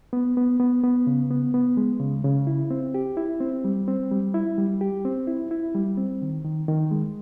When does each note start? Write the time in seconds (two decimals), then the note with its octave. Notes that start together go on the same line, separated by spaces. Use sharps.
0.13 B3
0.37 B3
0.60 B3
0.83 B3
1.07 C#3
1.30 B3
1.54 B3
1.77 G#3
2.00 C#3
2.24 C#3
2.47 E4
2.71 C4
2.94 G4
3.17 E4
3.40 C4
3.64 G3
3.88 C4
4.11 G3
4.34 E4
4.58 G3
4.81 G4
5.05 C4
5.27 E4
5.51 E4
5.75 G3
5.98 C4
6.22 D#3
6.45 D#3
6.68 D#3
6.91 G#3